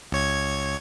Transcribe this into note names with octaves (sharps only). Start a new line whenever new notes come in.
C#2 C#5 G#6